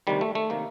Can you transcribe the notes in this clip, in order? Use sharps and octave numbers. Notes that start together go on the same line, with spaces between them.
D2 C3 D#3 G3
A3
A3
C3 D#3 A#3